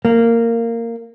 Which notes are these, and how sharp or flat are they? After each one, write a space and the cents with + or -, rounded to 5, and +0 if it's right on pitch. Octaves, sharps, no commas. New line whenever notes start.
A#3 -15